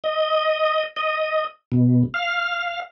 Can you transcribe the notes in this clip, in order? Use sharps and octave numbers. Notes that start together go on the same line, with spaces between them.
D#5
D#5
B2
F5